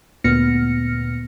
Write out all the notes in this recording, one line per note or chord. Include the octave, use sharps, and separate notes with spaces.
D2 A#2 B3 F6 A#6 C#7